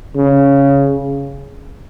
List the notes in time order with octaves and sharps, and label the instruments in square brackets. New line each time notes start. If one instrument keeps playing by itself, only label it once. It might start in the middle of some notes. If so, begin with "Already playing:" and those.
[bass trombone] C#3